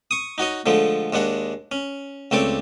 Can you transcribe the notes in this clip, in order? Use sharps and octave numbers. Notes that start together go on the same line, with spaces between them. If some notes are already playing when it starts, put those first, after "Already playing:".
C#6 D#6
D#4 F#4 C#5 D#5
D3 F3 G#3 A3
D#2 G#3 D4 F#5
C#4
C#2 A3 C4 C#5 D5 D6